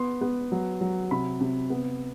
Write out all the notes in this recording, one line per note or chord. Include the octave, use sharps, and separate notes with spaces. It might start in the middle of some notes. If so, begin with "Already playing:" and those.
Already playing: B3 C6
B3
F#3
F#3
C3 B5
C3
B3